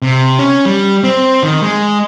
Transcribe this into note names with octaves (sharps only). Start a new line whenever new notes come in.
C3
C#4
G3
C4
D#3
G#3